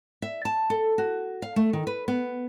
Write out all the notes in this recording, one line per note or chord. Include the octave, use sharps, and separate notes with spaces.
E5
A5
A4
F#4
F5
A3
D#3
B4
B3